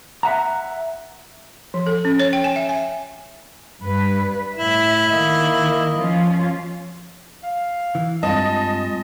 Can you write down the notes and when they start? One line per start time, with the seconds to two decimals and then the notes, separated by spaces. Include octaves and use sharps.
0.23 E5 F#5 A#5
1.74 F3
1.87 A4
2.05 C#4
2.20 C#5
2.33 G5
2.44 G#5
2.56 E5
2.69 G#5
3.81 G2 B4
4.58 A2 E4 E5
5.10 D#3 A#3 D#5
5.97 F3 C#4 F4
7.43 F5
7.95 E3
8.23 G2 G#3 C4 F4 D#5 A5